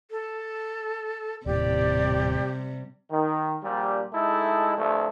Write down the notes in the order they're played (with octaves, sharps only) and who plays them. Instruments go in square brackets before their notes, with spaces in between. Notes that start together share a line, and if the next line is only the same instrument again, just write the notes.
[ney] A4
[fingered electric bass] D#1 A2 [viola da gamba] C3 G3 [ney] G4 [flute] D5
[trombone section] D#3
A#1 A#2 G3
G#3 A3 D#4 E4 A4
C2 G2 F3 A3